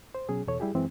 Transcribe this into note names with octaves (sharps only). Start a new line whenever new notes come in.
C5
B2 F#3 C#4 G#4
E2 B2 A4 C#5
G3 E4 G4 G#4
F#2 E3 G#3 C4